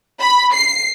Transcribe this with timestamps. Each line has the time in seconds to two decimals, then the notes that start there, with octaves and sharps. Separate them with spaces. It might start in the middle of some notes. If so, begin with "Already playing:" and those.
0.20 B5
0.53 C7